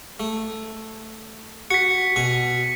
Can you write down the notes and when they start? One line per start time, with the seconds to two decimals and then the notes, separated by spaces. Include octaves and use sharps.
0.20 A3
1.70 F#4 B6 C#7
2.16 B2 G#5